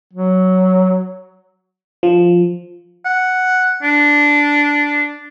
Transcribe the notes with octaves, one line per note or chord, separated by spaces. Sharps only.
F#3
F3
F#5
D4